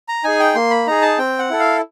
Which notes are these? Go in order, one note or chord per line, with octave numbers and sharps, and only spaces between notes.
A#5
D#4 G#4 G#5
G5
A#3 C6
B5
D#4 G#4 A#5
A5
C4 G5
F#5
E4 A4
F5